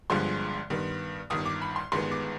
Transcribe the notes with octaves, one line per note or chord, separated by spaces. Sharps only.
G1 G2 D3 F3 G#3 C6
G2 D#3 B3
G1 G2 D#3 D#6
D6
B5
C6
G1 G2 D#3 G#3 B3 C6
D6